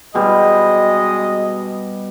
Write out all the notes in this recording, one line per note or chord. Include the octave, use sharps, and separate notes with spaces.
B2 G3 G#3 D#5